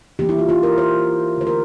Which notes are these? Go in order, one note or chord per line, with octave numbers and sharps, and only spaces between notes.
E3 A#3 G4
E4
F4
F4
A#4
C5
D3 A3 C5
A#4